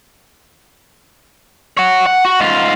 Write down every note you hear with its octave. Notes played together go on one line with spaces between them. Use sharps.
C#5 F#5
F#5
F#4
G#2 F4